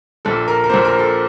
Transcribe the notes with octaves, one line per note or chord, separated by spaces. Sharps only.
A#1 A#2 A4
A#4
A#4
A#1 A#2 C5
A#4
A4